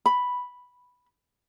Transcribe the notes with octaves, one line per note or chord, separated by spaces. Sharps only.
B5